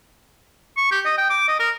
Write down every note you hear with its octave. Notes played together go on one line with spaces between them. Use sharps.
C#6
G4
D#5
G5
D6
D#5
A#4